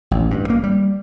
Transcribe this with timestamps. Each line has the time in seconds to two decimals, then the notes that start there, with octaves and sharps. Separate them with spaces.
0.11 A1
0.31 G2
0.50 A#3
0.63 G3